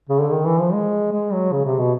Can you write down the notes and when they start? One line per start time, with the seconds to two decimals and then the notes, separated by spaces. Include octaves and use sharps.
0.09 C#3
0.20 D3
0.32 D#3
0.46 E3
0.60 F3
0.73 G#3
1.12 G#3
1.33 F#3
1.52 C#3
1.65 C3
1.79 B2